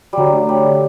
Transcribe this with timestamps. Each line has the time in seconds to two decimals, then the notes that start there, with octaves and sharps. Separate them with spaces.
0.13 D3 F#3 G3
0.33 A3
0.49 G3 G4
0.64 D3